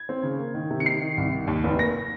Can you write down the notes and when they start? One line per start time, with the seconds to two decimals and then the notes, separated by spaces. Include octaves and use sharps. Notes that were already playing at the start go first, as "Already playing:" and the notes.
Already playing: G#6
0.09 C4
0.23 C#3
0.39 A#3
0.54 D#3
0.70 C3
0.80 C#7
0.85 D#3 C7
1.01 D#3
1.18 C2
1.32 D#3
1.47 D#2
1.64 F1
1.79 A#3 A#6